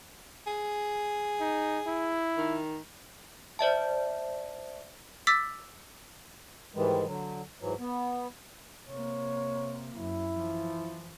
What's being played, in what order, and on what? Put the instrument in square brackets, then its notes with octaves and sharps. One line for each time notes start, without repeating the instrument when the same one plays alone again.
[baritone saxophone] G#4
[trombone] D#4
E4
[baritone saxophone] D#3
[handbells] C5 D5 E5 A5
[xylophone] D6 E6 A6 B6
[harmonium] G#2 D#3 E3 G3 G#3
D3 F#3
G#2 E3 F#3
B3
[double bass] C3 A#3 [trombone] C#5
[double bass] F#2 [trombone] E4
[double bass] E3 F3